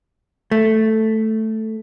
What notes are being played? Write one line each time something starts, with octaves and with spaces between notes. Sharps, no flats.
A3